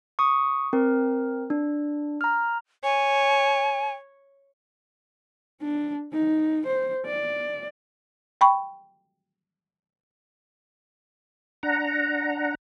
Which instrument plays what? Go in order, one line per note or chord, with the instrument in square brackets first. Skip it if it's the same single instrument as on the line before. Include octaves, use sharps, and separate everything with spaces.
[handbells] C#6 D#6
C4 A#4
D4
A#5 F6
[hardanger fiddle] C#5 [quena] G#5
[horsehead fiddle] D4
D#4
C5
D5
[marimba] G5 B5 C#6
[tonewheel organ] D4 F#5 A#5